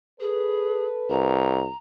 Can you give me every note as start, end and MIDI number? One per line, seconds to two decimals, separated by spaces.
0.21 0.86 68
0.21 1.60 69
0.21 1.60 71
1.10 1.68 36
1.10 1.77 82